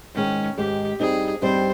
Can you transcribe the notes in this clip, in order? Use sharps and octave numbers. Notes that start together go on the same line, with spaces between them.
G#2 D#3 G#3 C#4
G#2 D#3 G#3 G4
G2 G3 C4 D#4 G#4
G2 G3 C4 D#4 C5